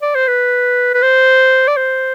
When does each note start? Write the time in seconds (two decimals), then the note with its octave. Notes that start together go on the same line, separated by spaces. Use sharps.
0.02 D5
0.15 C5
0.27 B4
0.94 B4
1.02 C5
1.67 D5
1.77 C5